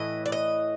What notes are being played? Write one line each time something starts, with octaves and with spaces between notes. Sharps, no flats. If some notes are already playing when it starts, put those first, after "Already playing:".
Already playing: A2 E3 D#5
D5
D#5